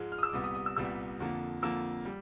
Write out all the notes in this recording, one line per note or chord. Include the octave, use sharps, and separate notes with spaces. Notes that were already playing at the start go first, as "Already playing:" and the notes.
Already playing: G#2 F3 G#3
F6
D#6
E6
D6
C2 A#2 G3 B3 D#6
D#6
D#6
E6
C2 A#2 G3 B3 E6
F2 D3 F3 A#3
F2 D3 F3 A#3 E6
G3